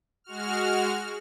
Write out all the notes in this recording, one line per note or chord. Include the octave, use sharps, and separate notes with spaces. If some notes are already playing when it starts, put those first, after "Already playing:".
G#3 F#4 F6